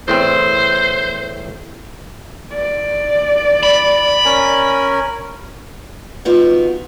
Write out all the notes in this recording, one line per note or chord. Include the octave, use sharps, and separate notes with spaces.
E2 A2 C4 C5
D5
B5
C#4 A#4 G#5
D#3 B3 F4 F#4 G5